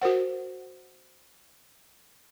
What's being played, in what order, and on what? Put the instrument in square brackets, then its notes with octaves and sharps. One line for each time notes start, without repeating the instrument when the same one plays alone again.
[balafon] F#4 A#4 C5 F#5